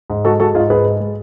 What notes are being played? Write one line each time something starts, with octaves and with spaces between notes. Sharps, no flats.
G#2
G#3 F#4 A4
G#3 F#4 A4
G#2 F4 G#4
G#2 G#4 B4
G#3
G#3